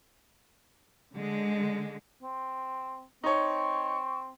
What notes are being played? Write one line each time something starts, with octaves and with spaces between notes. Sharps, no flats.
D3 G#3
C4
C4 D#4 C#5 C#6